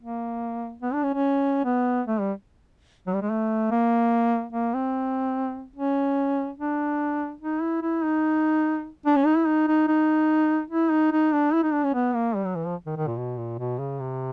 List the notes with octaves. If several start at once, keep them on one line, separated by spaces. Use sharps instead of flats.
A#3
B3
D4
C#4
C#4
B3
A3
G3
F#3
G3
G#3
A3
A#3
A#3
C4
C#4
D4
D#4
E4
E4
D#4
D4
C#4
D#4
E4
D#4
D#4
D#4
E4
D#4
D#4
D4
E4
D#4
D4
C#4
B3
A#3
G3
F#3
E3
F3
D#3
D#3
A#2
B2
A#2
B2
C#3
C3